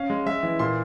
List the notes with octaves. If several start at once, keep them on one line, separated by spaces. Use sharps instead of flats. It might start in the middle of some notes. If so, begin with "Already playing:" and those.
Already playing: C#4 F5
G#3
G#3 E5
E3
A#2 C6